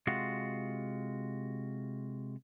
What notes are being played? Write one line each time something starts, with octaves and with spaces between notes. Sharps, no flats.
C3 G#3 F4 F#4